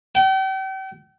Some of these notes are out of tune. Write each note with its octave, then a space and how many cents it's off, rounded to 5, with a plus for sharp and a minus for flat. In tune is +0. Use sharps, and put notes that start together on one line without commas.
G5 -40